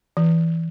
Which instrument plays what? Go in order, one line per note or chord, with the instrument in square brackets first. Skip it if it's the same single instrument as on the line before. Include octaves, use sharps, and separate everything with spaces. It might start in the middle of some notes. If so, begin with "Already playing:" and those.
[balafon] E3